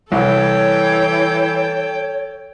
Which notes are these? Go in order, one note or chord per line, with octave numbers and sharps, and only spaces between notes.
C2 E3 A4 C#5 G5